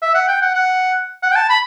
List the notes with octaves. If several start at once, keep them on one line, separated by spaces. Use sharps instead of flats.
E5
F#5
G5
F#5
F#5
F#5
G5
A5
B5